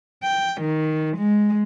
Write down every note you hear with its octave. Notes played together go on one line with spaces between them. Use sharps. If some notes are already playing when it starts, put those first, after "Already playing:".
G5
D#3
G#3